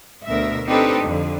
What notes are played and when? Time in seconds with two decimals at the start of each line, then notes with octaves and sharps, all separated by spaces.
0.25 D2 B2 A#4 E5
0.66 C4 D4 D#4 G4 A4 B4
1.02 F2 D3